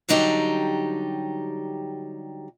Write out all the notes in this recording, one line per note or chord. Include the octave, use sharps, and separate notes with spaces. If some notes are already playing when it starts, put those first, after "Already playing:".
D3 F#3 G3 D#4 G4